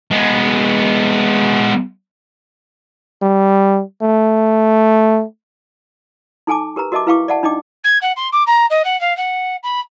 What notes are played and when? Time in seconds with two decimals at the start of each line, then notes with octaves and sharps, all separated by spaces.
0.11 G#3 B3
3.22 G3
4.02 A3
6.47 D#4 A4 G#5 A5 D6
6.76 G4 A#4 B4 A#5
6.92 F#4 A#4 D#5 E5 A5 D6
7.07 E4 B4 F5 G5 C#6 D6
7.28 D5 E5 F#5 G5 A5
7.43 D4 D#4 D#5 G5 D6
7.84 G#6
8.01 F#5
8.16 C6
8.32 D6
8.47 A#5
8.70 D#5
8.84 F#5
9.00 F5
9.17 F#5
9.63 B5